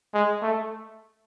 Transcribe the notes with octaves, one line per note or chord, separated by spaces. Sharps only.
G#3
A3